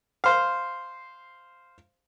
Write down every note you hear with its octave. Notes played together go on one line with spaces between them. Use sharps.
C5 F5